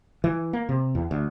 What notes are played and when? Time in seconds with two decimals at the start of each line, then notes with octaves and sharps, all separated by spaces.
0.24 E3
0.53 A#3
0.69 C3
0.95 E2
1.11 D2